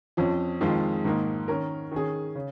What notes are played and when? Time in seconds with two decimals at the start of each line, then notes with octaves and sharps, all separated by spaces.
0.17 F2 F3 C#4
0.61 F2 D#3 G#3 F4
1.04 G#2 D#3 A#3 D#4
1.48 D#3 C#4 A#4
1.91 D#3 C#4 G#4
2.35 C#3